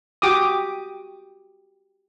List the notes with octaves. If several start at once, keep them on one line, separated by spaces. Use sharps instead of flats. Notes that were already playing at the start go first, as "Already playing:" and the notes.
F#4 G4 D6 D#6